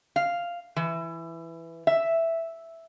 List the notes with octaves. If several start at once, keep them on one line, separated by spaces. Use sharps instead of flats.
F5
E3
E5